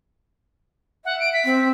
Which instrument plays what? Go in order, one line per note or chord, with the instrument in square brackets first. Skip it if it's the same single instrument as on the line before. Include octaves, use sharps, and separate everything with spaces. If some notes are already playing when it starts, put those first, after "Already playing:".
[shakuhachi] E5 [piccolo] F#5
[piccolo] D7
B6
[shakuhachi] C4